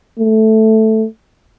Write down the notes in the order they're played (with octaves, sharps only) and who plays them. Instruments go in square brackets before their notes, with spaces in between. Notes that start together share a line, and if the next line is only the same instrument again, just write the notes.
[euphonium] A3